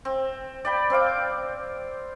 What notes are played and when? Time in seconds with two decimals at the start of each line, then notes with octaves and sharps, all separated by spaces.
0.05 C4
0.65 D5 G5 B5
0.90 C4 C5 F5 D6